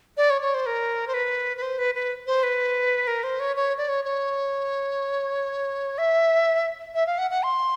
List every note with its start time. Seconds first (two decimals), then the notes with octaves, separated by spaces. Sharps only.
0.17 D5
0.30 C#5
0.42 C#5
0.54 C5
0.66 A#4
1.08 C5
1.14 B4
1.57 B4
1.62 C5
1.78 B4
1.95 B4
2.27 C5
2.43 B4
3.07 A#4
3.24 C5
3.40 C#5
3.56 C#5
3.78 D5
3.89 C#5
4.05 C#5
5.98 E5
6.95 E5
7.07 F5
7.18 F#5
7.31 F#5
7.43 C6